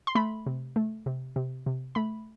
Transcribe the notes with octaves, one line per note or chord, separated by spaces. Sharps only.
C6
A3 B5
C3
A3
C3
C3
C3
A3 B5